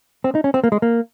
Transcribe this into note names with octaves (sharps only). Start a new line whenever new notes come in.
C4
D#4
C#4
C4
A#3
G#3
A#3